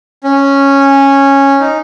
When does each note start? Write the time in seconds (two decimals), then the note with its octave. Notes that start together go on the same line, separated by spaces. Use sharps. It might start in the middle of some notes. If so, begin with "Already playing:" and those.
0.24 C#4
1.60 D#4